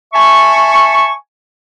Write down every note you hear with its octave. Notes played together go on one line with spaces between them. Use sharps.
E5 G#5 A5 C#6